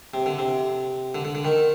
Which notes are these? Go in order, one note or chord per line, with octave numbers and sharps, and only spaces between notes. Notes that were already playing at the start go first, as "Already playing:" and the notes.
C3
D3
C3
D3
D3
D3
D#3